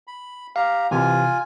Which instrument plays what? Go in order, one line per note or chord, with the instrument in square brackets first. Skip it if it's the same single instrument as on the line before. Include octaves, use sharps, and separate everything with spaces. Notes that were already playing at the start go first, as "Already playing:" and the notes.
[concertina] B5
[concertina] G4 A#5 [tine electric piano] F5
[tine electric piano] C3 E3 [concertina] F4 G#5